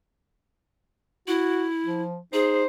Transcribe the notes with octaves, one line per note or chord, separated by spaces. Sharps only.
E4 F#4
F3
D#4 G#4 C5